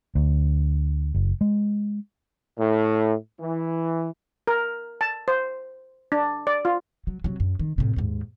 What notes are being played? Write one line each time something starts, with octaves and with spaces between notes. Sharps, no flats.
D2
F#1
G#3
A2
E3
A#4
A5
C5
D4
D5
F4
F#3
C3 F#3
F#2
D#3
A2 C3
D#2 G#2